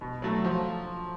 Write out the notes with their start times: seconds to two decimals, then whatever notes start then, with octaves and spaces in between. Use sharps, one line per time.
0.01 B2
0.22 F#3 A3
0.44 F3